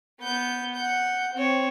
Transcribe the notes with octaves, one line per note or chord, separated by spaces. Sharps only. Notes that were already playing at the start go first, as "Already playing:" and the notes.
B3 G6
F#5 G6
C4 C#5